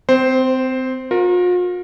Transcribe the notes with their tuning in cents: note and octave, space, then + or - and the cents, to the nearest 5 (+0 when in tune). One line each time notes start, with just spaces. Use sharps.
C4 -25 C5 +0
F4 +45 A#4 +5